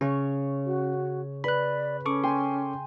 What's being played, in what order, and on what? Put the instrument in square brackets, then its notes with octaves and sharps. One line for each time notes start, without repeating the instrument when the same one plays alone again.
[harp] C#3 C#6 [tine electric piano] C#4 [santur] C#5
[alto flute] F#4
[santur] B4 [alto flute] D5 [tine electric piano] B5 F#6
[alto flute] C#4 [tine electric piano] A4 C#6 D6
[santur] G5 G#5 C6